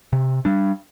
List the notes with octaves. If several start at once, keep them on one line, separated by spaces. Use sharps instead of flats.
C3
G3 D4